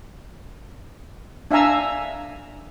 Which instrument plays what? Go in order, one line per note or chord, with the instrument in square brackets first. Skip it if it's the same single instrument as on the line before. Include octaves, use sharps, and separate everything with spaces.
[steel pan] D4 E5 F5 G#5 A#5 E6